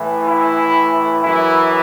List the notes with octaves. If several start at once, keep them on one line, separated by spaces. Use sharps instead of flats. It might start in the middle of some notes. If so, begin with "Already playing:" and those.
Already playing: A2 E3
E4
F#2 E3 E4